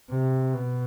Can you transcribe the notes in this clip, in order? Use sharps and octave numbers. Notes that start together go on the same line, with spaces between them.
C3
B2